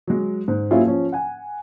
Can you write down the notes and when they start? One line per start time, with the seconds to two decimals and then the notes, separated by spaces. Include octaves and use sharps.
0.07 F#3 G#3
0.48 G#2
0.71 F#3 A#3 C#4 E4 F4 G#4
0.84 F3 C#4
1.12 F#5 G#5